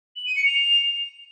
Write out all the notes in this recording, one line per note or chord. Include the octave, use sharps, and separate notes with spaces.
F#7
D#7
C#7
F7